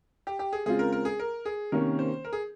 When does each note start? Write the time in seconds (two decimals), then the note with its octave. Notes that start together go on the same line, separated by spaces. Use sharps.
0.27 G4
0.39 G4
0.53 G#4
0.66 C#3 G#3 C4 F4 G#4
0.79 A#4
0.92 A#4
1.05 G#4
1.20 A#4
1.45 G#4
1.72 C3 D#3 A#3 C#4 A#4
1.99 C5
2.25 A#4
2.33 G#4